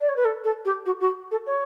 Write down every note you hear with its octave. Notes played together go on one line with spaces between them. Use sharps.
D5
C#5
B4
A4
A4
G4
F#4
F#4
A4
C#5